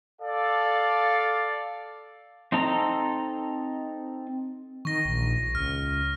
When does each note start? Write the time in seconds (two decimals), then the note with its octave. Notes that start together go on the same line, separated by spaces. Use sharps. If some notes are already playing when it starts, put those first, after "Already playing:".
0.21 A4 D5 F5
2.52 C4 D#4 A4 A#5
4.85 D#3 C#6 A#6
5.05 A#1
5.55 C#2 F6